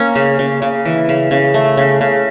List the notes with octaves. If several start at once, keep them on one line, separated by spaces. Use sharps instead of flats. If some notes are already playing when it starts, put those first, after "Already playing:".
Already playing: A#3 C#4
C#3
C#3
C#3
E3
C#3
C#3
A3
C#3
C#3